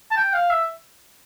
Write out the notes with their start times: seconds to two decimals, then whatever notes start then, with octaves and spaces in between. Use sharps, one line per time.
0.11 A5
0.17 G5
0.34 F5
0.50 E5